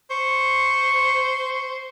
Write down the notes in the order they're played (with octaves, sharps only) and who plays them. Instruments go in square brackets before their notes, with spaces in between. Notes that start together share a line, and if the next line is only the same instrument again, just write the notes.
[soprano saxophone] C5 [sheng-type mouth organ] C#6